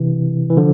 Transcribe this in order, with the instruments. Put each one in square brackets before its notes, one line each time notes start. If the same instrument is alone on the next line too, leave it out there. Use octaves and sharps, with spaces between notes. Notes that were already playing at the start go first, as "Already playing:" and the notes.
Already playing: [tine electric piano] C3 E3
E3
D3 F3